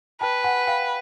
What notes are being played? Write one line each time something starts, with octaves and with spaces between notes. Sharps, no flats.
B4 G5 A5
F#5 G#5
F5 G5